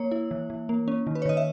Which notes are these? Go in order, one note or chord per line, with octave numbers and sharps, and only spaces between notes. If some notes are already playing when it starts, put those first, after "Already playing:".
Already playing: A#3 C#5
E4
E3
E3
A#3
C#4
D#3
B4
C#5
D#3 D#5
E5